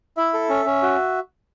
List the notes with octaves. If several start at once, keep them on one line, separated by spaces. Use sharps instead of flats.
E4 E5
A4
C#4
C#4
F#4